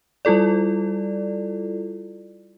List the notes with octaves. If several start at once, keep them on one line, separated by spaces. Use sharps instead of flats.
G3 E4 F4 A4 D5